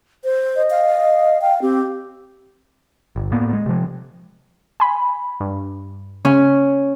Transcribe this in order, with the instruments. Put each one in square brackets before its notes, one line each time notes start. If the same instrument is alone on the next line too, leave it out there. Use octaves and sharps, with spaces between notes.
[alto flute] C5
[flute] D#5
[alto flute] F5
[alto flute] F5 [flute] G5
[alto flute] C4 [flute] G4
[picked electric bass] G1
A2 A#3 B3
G#3
C3 F3
[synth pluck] G#5 B5
G2
[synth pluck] C#3 [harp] C#4